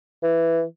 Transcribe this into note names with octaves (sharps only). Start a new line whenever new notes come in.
E3